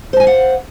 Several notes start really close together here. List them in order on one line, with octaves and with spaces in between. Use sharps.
C5 A5 G#5 F5 F#5